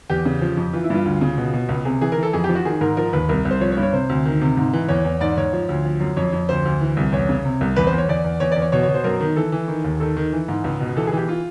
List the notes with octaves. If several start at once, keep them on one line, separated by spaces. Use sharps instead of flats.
E2 G4
C#3
F3
F2
E3 F4
E4
G2 F4
D2
C#3
B2
B2
C#2
C3 G#4
E3 G#4
E3 A#4
A4
F2 G#4
G4
F3
F#4
D#3 G#4
G#2 A#4
F3 A#4
D#2 B4
C2 A#4
C2
C5
F3 C#5
C#5
G2
C#5
C3 C5
D2
D#3
C3
G#2
E3
E2 C#5
E2
G#2 D5
G#2 C#5
F3
D2
F3
F#2
F2 C#5
F2
D2 C5
D2
E3
C2
E2 C#5
C#3
C3
C2
E2 B4
C5
E2
C#5
E2 D5
E2
E2 C#5
E2 D5
C#5
B2 C#5
C#5
B2
C5
F#2 A#4
D#3
E3 A4
E3
D#3
D#2
D#3 A4
D#3
E3
G#2
C#2
B2
E3 A4
G#4
E3 G4
F4